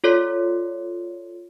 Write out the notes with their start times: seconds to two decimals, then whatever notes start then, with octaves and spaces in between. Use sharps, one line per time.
0.04 F4 A4 C#5 D5 C6 B6